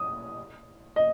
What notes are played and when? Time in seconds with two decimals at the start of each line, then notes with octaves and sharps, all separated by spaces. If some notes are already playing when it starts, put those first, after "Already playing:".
Already playing: D#6
0.96 D#5